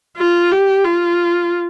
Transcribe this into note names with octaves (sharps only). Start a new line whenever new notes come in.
F4
G4
F4